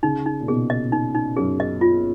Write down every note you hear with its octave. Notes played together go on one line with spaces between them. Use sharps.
C#3 D#4
D#4
A#2
B2 G#4
D#5
D#4
D#4
F#2 G#4
D#5
F4